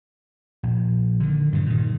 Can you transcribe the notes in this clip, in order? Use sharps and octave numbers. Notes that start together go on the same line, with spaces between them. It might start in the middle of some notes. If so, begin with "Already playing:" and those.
A#1
D3 D#3
G2 A#2 C#3
A#2 D#3